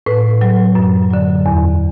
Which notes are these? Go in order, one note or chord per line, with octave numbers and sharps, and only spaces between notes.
A2 B4
F#3
F#2
D3 F#3
E2